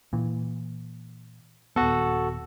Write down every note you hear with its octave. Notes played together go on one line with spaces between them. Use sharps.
A#2 E3
D#1 B3 F#4 A4